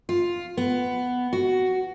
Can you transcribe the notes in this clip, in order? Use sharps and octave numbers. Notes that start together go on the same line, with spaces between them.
F4
B3
F#4